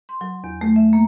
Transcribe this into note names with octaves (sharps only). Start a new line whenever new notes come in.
C6
F#3
E2
A3
E5
A#3